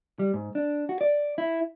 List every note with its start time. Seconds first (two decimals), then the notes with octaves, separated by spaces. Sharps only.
0.19 G3
0.34 G#2
0.55 D4
0.89 F#4
1.01 D5
1.38 E4